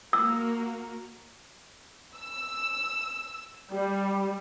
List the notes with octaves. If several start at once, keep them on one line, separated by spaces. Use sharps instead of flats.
A#3 F#4 A#4 E6
E6
G3